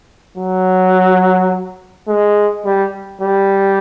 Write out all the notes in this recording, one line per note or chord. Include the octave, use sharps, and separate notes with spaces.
F#3
G#3
G3
G3